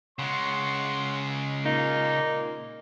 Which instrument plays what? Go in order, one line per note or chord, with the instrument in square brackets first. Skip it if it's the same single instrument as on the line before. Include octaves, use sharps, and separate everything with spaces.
[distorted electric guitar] C#3 G#3 [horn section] C#5 F#5 C6
[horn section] A#2 A#3 [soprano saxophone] D#4